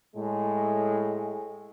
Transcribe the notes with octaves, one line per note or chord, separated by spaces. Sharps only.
A2 G#3